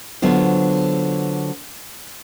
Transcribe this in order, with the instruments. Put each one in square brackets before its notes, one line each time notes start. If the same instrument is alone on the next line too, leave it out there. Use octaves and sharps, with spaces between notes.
[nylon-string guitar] D3 F#3 B3 F4 C5